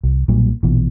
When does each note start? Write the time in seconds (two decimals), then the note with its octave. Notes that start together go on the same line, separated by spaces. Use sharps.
0.04 C2
0.28 B1 A#2 F#3 G3
0.63 A#1 B2 E3